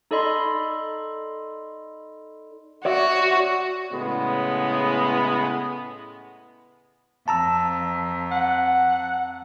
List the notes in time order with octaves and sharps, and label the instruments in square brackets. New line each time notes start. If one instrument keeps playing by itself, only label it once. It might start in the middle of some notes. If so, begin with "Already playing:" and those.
[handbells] D#4 A4 D5 D#5 B5 C6
[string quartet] F#4 [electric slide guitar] C#5 D5 E5
[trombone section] A2 C#3 G#3 B3
[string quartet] F2 [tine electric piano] A5 A#5 E6
[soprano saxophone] F#5